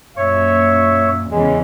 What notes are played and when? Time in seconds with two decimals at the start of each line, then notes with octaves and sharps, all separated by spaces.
0.17 F#2 A#2 C#5 E5 C#6
1.31 E2 C#3 E3 G#3